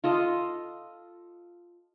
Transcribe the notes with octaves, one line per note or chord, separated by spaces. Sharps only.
F4 A4 D#5